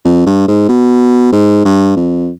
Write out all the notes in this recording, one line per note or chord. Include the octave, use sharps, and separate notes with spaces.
F2
G2
G#2
B2
G#2
G2
F2